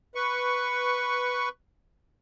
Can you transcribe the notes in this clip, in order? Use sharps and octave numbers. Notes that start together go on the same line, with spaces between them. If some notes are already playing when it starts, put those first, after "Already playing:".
B4 C#6